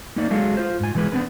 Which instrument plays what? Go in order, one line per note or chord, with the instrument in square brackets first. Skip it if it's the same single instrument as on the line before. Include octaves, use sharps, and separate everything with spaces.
[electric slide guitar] A#3 D#4 D5
F#3 G#3 F#4 G#4 A4 F5
F4 C5
G#2 G#5
B2 E3 G#3 G#4 B4
B3 C4 D4 B4